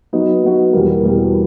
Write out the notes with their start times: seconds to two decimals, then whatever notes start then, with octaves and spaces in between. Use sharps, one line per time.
0.13 F#3 B3 D#4 F#4
0.44 F#3 B3 D#4 F#4
0.73 E2 B2 G3 A#3
1.03 E2 B2 G3 A#3